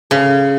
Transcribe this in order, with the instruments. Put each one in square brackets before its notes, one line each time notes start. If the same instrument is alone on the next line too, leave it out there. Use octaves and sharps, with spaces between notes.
[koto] C#3